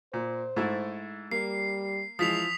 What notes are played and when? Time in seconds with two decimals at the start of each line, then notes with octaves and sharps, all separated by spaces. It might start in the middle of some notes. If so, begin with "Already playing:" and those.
0.14 A#2 C5
0.56 G#2 A3 E4
1.31 G3 A#3 C7
2.19 E3 F3 G#3 D#6 B6 F7